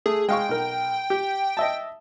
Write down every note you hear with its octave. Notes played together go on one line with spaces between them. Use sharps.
A3 G#4
G#3 F5 G5 C#6
B1 A#4
G4
D#5 E5 A5